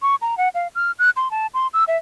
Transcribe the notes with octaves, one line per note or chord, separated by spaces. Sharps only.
C#6
A#5
F#5
F5
F6
F#6
C6
A5
C6
E6
E5